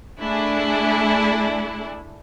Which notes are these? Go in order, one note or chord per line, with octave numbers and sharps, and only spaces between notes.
A3 D4 E4 G#4